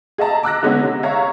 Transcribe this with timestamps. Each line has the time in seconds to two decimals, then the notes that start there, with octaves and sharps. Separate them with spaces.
0.18 G#4 D#5 E5 A5 A#5
0.43 D6 E6 F#6 A#6
0.63 D3 G#3 B3 C#4 D#4 G#4
0.83 C3
1.03 C#5 E5 F5 A#5 C#6